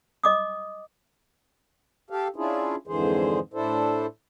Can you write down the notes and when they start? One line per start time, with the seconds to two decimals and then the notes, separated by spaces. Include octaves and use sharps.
0.24 D#5 D6 D#6
2.10 G4 A4 F5
2.36 C#4 D4 E4 F4 G#4
2.87 F2 G#2 D3 E3 G#4 C5
3.54 A2 D4 E4 A4 C5